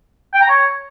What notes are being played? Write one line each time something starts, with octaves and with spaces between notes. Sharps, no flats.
G5
A#5
C#5